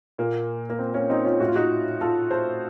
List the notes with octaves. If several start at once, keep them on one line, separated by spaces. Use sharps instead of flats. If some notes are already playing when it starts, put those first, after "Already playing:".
A#2 A#3
A#3
C4
A#3 C#4
C4 D#4
C#4 F4
A2 F#4
F4
D#4 F#4
F4 A4
A4 C5